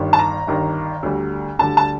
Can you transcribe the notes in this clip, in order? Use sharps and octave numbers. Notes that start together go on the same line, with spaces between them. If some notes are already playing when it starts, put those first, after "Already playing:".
Already playing: G1 G2 D#3
A5
A#5
G1 G2 D#3
D2 D3 G3
D2 D3 G3 A5
A5